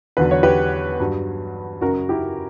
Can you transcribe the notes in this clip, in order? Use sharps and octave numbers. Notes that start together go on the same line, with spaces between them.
E2 D3 F#3 B4
C#5
G4 B4
G2 F#3
F#2 C#3 F#3 F#4 A#4
E4 G4